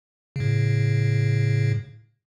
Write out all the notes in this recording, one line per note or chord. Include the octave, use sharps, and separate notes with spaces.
A2 C#3